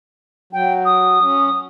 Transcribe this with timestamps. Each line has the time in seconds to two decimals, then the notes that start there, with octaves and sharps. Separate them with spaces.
0.53 F#3 G5
0.85 D#6
1.22 C#4